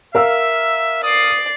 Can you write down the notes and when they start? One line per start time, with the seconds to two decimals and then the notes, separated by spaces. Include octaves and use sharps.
0.15 A#4 E5 F5 E6
1.04 D5 D#6 C7